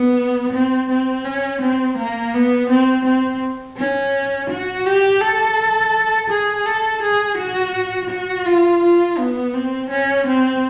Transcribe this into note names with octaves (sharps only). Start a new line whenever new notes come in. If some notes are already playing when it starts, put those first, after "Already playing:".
Already playing: B3
C4
C4
C#4
C4
A#3
B3
C4
C4
C#4
F#4
G4
A4
G#4
A4
G#4
F#4
F#4
F4
F4
B3
C4
C#4
C4